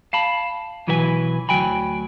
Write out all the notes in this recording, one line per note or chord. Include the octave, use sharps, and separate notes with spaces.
F5 A5 B5
B1 E3 F#3 B4 E5 G#5
D2 F#3 G5 G#5 B5